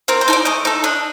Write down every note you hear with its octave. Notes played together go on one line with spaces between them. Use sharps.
C4 A#4
C5
D#4 A4
D5
A3 D#5
D#4 A4
D4 D#5